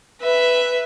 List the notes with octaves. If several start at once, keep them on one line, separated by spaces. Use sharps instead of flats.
B4 E5